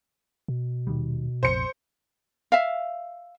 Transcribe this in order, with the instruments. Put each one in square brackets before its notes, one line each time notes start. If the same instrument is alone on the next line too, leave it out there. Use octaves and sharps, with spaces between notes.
[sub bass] B2
[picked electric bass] D#1 D#3 G3
[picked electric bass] A#1 F2 C3 [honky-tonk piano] C5 C#7
[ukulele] E5 F5